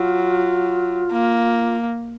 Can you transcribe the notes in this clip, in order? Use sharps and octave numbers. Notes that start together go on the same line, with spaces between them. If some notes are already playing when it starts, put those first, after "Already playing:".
Already playing: F#3 F4
A#3